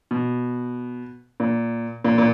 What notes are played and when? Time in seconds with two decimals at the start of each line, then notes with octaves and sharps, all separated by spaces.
0.11 B2
1.40 A#2
2.04 A#2
2.18 A#2